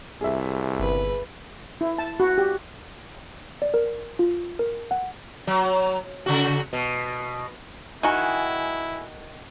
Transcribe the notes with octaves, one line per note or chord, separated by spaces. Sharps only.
C2 G#4 E5
G1 B4
E4
A5
F#4
G4
D5
A#4
F4
A#4
F#5
F#3
C#3 F#4
B2
D#3 E4 F#4 G#5